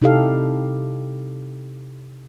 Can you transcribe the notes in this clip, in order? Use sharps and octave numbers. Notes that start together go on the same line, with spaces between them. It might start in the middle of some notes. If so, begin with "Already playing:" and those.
C3 D#4 E4 G4 A4 F5